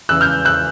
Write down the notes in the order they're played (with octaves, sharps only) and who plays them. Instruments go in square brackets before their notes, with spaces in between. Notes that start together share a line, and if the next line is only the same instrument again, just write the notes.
[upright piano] E2 C#3 E3 E6 F#6
F6 G6
E6 F#6